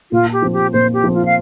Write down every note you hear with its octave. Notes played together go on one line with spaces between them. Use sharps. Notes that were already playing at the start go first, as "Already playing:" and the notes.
A#2 F4
G4
F3 C4
G4
A#2 C5
G4
F3 C4
F4
F5